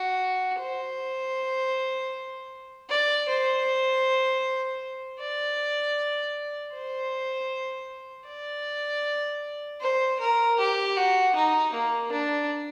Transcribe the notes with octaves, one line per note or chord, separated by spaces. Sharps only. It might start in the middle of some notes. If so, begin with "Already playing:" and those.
Already playing: F#4
C5
D5
C5
D5
C5
D5
C5
A#4
G4
F#4
D#4
A#3
D4